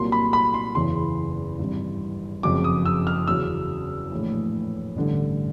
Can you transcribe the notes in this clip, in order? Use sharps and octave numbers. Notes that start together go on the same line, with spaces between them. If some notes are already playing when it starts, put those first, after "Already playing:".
Already playing: C2 A#2 F#3 A#3 C6
B5
B5
C6
F#1 E2 C#3 E3 C6
G#1 G2 E3
F#1 F2 C#3 F#3 D6
D#6
E6
F6
E2 C#3 F#3 E6
A#1 A2 E3
A1 G2 D3